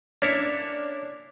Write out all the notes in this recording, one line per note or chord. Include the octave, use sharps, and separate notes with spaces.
A#3 C#4 D4 E4 C#5 A6